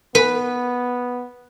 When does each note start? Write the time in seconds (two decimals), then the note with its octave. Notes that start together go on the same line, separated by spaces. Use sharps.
0.15 B3 B4